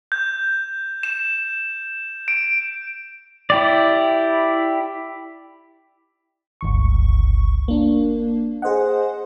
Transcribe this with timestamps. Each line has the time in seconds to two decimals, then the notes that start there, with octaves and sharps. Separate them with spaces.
0.12 G6
1.03 E7
2.28 D7
3.50 E4 G4 D5
6.61 G1 C#2 C#6
7.68 A#3 D4
8.62 G#4 C5 D#5 F#5